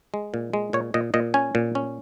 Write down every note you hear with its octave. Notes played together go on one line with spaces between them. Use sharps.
G#3
A#2
G#3
A#2 C#5
A#2 D#5
A#2 D#5
C#4 G#5
A#2
C#4